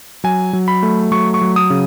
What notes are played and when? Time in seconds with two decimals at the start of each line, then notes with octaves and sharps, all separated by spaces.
0.24 F#3 G#5
0.53 F#3
0.68 B5
0.83 A3
1.12 F#3 C#6
1.34 C#6
1.41 F#3
1.56 D#6
1.70 C#3